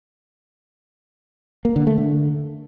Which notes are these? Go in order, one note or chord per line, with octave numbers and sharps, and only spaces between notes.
A#3
D3
A3
D3